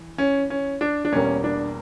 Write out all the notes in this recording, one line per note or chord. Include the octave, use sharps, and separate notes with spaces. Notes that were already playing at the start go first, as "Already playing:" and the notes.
Already playing: E3
C#4
C#4
D4
D4
E2 B2 G3 A#3 C#4
D4